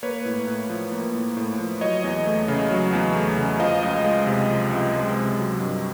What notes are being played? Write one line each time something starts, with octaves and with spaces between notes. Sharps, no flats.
A#3 B4 C#5
A2
A2
F3
A#3
A2
A2
F3
F#3 C#5 D#5
E2
A3
C#3
F#3
E2
A3
C#3
F3 D#5 F5
C#2
G#3
C3
F3
C#2
G#3
C3
F#3
G2